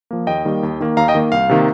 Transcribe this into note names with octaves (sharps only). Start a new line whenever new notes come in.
F3 A#3
D#2 D#5 G5
D#3 G3 A#3
D#2
D#3 A#3
D#2 F5 A#5
D#5 G5
D#3 A#3
C2 F5
C3 D#3 A#3